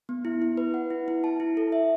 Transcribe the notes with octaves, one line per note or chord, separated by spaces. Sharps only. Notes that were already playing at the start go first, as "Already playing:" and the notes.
B3
E4
E4
B4
F#5
E4
E4
A5
E4
A4
E5